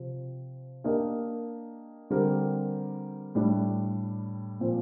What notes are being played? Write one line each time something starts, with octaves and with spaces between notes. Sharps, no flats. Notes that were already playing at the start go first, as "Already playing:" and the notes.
Already playing: C3 F3 C4
A#3 D4 G4 A#4 D#5
D3 G3 C4 G4 A#4
A2 G3 D4
A#2 F3 C4